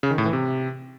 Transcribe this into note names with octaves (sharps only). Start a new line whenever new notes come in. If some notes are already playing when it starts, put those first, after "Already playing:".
C#3
D#3
A2
E3
C3